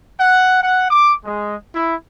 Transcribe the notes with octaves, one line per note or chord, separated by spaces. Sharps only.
F#5
F#5
D6
G#3
E4